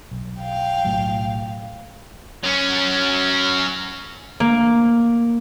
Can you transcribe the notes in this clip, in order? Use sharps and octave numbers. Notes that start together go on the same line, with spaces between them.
B1
F5 G5
B1 A2 F#3
F#3 C#4
A#3